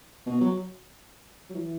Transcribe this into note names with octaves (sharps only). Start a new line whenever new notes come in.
B2
F#3
F#3
E3